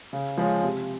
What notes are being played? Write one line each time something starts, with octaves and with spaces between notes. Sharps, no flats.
C#3
F3 G#3 C#4
C3